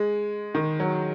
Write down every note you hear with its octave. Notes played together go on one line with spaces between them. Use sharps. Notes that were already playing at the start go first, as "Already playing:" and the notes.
Already playing: G#3
D#3
F#3